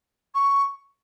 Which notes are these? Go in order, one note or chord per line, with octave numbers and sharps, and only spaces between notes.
C#6